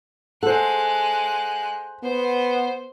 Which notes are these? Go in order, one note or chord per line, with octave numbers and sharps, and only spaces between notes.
G#3 A4 C5 F#5 F#6
B3 C5